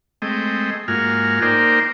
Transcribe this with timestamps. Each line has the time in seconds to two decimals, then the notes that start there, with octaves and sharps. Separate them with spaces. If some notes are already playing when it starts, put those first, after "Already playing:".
0.22 G#3 A3 C4 D#5 G5
0.88 G#2 A#3 F4 F#4 G#5 F6
1.42 A#3 D#4 A#4 C5 D5 G5